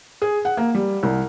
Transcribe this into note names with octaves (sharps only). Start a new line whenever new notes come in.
G#4
F#5
A#3
G3
C2